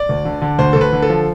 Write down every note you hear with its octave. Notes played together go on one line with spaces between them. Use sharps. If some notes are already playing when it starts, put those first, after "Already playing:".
Already playing: D5
D2
D3
D3
D2 C5
A4
D2
B4
D3
A4
F3